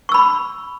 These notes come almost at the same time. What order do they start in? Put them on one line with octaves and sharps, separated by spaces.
C#6 E6 B5